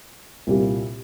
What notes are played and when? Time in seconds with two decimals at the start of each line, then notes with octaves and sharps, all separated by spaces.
0.47 C2 A#2 G3